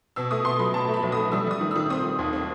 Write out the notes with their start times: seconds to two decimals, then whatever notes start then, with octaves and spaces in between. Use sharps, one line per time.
0.16 B2 E6
0.31 A3 D#6
0.45 B2 C6
0.59 F#3 B5
0.74 B2 A5
0.89 A3
0.94 B5
1.03 B1
1.12 A3 D#6
1.32 G3 E6
1.47 G3 D#6
1.61 D#3
1.71 D#3 E6
1.90 C4 D#6
2.04 C4
2.19 D#2
2.33 C4